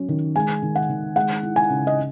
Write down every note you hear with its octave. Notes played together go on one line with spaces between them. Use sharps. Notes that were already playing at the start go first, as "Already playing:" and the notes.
Already playing: F#3 C#4
D#3
G#3 G#5
D#3
F#5
D#3
G#3 F#5
E4
G#5
C#3
D#5